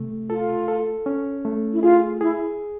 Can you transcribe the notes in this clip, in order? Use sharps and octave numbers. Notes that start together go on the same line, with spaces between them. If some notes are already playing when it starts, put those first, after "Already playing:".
Already playing: C3 A3
F4 A4
A4
C#4
A3
E4
F4 G#4
E4 G#4